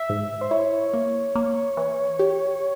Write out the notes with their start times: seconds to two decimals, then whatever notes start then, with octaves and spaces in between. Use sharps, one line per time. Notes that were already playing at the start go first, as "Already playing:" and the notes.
Already playing: E5
0.09 G#2
0.41 C5
0.51 E4 C#5
0.94 A#3
1.35 A#3
1.77 E3
2.19 G4